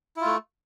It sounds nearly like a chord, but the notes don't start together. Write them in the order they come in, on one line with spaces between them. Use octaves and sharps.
E4 F4 A3